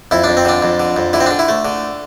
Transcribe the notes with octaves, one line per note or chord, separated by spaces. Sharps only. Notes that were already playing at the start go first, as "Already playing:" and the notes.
F2 E4
F2 D4
C4
D3 D4
F2
D3
F2
D3 E4
C4
D4
D3
E4
A3
D3